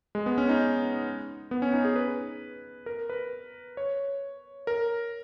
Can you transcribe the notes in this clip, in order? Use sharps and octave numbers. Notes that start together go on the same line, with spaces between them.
G#3
B3
C#4
D#4
B3
C#4
D#4
G#4
B4
A#4
B4
C#5
A#4